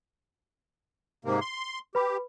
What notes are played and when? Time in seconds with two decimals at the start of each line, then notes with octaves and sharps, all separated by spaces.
1.25 G#2 C3 A#3
1.40 C6
1.95 G4 B4 B5